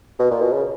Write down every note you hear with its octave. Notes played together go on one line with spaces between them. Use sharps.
B2
A#2
B2
C#3